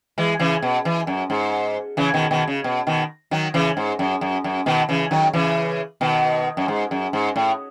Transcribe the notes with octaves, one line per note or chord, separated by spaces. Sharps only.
E3 G#3
C#3 E3
B2
E3
F#2
G#2
C#3 E3
B2 D#3
B2 D#3
C#3
B2
B2 D#3
D#3 F#3
C#3 E3
G#2
F#2
F#2
F#2
B2 D#3
C#3 E3
D#3 F#3
C#3 E3
B2 D#3
F#2
G#2
F#2
G#2
A2